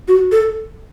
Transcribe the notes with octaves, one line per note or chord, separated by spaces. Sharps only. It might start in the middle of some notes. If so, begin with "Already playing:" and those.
F#4
A4